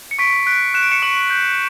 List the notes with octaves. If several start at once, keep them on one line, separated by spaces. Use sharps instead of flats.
C#7
C#6 B6 D7
F#6 B6 D7
F#6 E7
D7
C#7 E7
C#6 D7 F#7
G6